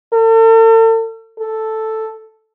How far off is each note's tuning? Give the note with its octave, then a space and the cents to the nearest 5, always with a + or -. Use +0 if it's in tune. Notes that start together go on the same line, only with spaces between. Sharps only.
A4 +40
A4 +0